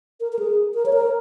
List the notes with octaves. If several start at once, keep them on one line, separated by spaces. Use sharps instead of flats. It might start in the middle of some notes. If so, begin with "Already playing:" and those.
A#4
A#4
G#4
A#4
C#5
A#4